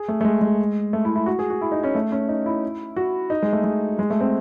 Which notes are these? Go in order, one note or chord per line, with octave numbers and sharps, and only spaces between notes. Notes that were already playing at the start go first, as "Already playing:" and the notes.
Already playing: G#4
A3
A3
G#3
G#3
A3
E4
E4
F#4
G#4
F#4
E4
D#4
C#4
A3
C#4
D#4
E4
F#4
D#4
G#3
A3
G#3
G#3
A3
C4